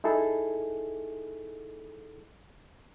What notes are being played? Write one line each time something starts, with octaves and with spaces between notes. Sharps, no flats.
D#4 E4 G#4 A4